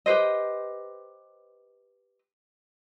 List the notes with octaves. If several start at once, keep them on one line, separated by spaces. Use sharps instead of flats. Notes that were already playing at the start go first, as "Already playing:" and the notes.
G4 B4 C5 D#5